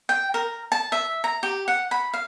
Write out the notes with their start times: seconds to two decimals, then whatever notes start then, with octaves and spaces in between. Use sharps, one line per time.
0.09 G5
0.34 A#4
0.72 A5
0.92 E5
1.24 A#5
1.43 G4
1.68 F#5
1.91 B5
2.14 F5